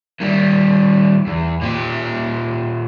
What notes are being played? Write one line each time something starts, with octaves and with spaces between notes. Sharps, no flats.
D#3 G3
E2
A#2 G4